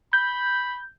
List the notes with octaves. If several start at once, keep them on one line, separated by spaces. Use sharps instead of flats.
B5 G6